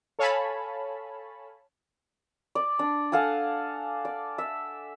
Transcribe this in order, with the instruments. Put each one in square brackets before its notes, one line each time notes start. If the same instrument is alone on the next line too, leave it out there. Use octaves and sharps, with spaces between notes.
[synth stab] A4 C#5 F5 G#5 A5 B5
[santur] D5
D4
A4 F5 F#5 G#5
D5
E5